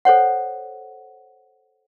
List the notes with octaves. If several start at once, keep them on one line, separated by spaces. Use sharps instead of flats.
A4 C5 C#5 F#5